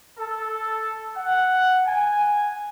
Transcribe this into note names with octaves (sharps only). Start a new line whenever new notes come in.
A4
F#5
G#5